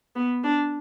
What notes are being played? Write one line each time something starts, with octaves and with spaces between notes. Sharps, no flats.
B3
D4